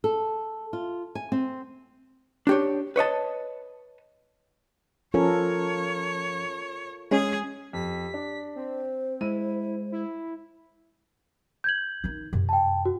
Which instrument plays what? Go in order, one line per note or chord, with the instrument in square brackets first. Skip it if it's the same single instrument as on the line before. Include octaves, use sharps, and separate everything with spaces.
[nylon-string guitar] A4
F4
G#5
C4
[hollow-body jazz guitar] D4 G4 C#5
B4 C#5 D#5 A5
[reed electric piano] F3 C#4 [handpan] F4 A4 A#4 [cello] C#5
[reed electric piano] G#3 C#4 [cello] G#4
[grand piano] F2 [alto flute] G4 [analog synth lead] B6
[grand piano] D4
[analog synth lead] C4 [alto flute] C5
[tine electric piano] G#3 [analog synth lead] E4 [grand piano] D#7
[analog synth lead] E4
[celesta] G6 G#6 F#7
[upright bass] D#3 D#4
F#2 C3
[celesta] G5 A5
F#4